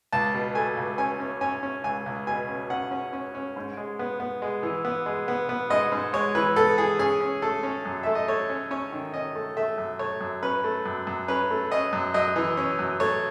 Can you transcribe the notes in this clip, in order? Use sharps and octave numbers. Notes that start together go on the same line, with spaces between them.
C#2 A5
B2
A3 G#5
C#2
C#4 G#5
C#4
C#4 G#5
C#4
C#2 G#5
C#2
B2 G#5
C#4
C#4 F#5
C#4
C#4
C#4
G#2
G#3
B3
B3
G#3
E3
B3
G#3
B3
B3
G#2 D#5
G#2
G#3 C#5
E3 B4
B3 A4
E3 G#4
C#4 G#4
C#4
A3 A4
C#4
F#2
A3 E5
D#5
A3 C#5
C#4
C#4 C#5
D#3
C#4 D#5
A3
A3 E5
F#2
A3 C#5
F#2
C#4 B4
A3
F#2
F#2
C#4 B4
A3
C#4 D#5
F#2
F#2 D#5
E3
C#4
F#2
A3 C#5